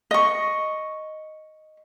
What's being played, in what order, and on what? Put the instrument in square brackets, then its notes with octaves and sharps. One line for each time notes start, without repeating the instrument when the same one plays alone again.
[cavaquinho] D#5 C#6